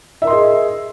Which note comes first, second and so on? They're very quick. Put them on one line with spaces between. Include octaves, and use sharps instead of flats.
E5 A#4 C6 D#5 G#4